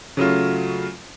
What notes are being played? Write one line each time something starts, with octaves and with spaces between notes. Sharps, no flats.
C#3 F#3 A3 F4